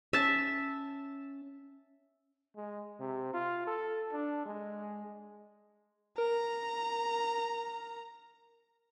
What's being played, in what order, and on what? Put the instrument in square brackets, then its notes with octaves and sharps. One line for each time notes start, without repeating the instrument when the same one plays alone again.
[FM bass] C#4 [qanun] E5 A5
[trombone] G#3
C3
F4
A4
D4
G#3
[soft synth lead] A#4 [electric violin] A#5